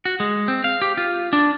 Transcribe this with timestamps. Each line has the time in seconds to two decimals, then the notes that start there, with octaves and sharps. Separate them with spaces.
0.05 F#4
0.20 G#3
0.48 C4
0.64 F5
0.82 G4
0.97 F4
1.33 D4